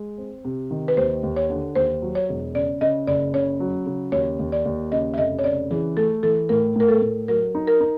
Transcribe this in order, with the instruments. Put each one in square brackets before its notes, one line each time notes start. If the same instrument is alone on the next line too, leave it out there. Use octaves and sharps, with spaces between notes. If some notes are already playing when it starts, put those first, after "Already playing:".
Already playing: [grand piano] G#3
C4
C3
D#3
[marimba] B4
[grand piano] D#2 [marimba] C5
[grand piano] D#2
[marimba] C#5
[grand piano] D3
[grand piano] D#2 [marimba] C5
[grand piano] F#3
[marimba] C#5
[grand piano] E1
[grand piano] C#3 [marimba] D5
[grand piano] C#3 [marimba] D#5
[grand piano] F#1 [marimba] D5
[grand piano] C#3 [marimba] C#5
[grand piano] F#3
C#3
[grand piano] D#2 [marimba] C#5
[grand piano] D#2
[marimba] D5
[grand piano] D#2
[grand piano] C#3 [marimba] D#5
[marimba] E5
[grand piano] F1 [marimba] D#5
[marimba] C#5
[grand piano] C#3 [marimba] D5
[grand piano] E3 [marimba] G#4
[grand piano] A3 [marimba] A4
[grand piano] E3 [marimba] A4
[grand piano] A2 [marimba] A#4
[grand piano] A2 [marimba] A#4
[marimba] A4
[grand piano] A2
[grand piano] F#3 [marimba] A#4
[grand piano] D#4
[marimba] A#4
[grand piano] D#4